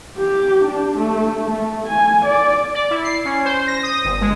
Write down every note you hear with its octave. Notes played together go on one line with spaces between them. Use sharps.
G4
D4
A3
A3
G#5
D5
D5
E4
C7
C#4
C5
A#6
D#6
G1
G#3